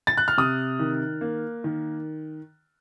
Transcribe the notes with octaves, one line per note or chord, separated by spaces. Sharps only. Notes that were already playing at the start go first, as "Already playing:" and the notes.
A6
F#6
F6
C3 D#6
D#3
A#3
D#3